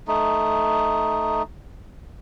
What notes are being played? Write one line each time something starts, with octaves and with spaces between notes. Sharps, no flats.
A3 D#4